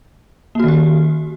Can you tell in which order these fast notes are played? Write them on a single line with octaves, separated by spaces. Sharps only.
A#3 F#4 D#3 G4